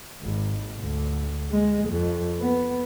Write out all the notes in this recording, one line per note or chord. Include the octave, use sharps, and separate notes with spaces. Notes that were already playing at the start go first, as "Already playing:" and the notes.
G#1
D2
G#3
F2
B3